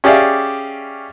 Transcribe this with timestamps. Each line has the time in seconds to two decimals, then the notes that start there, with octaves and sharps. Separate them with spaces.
0.04 C#4 G4 G#4 D5 E5 F5